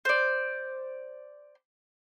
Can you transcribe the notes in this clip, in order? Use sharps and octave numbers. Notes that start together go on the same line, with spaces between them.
C5 D5